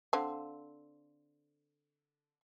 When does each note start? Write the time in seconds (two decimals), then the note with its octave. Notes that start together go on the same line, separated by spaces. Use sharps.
0.13 D3 C4 F5